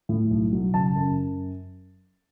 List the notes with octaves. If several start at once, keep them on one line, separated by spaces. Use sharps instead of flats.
A2
B1
F#3
F#1 A5
F#2